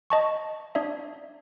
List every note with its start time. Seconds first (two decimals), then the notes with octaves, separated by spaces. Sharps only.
0.10 D#5 A5 C#6
0.75 D4 D5 E5